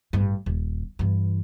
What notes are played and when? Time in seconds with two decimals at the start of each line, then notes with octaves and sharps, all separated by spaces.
0.13 A1 G2
0.46 D#1
0.99 G2 E3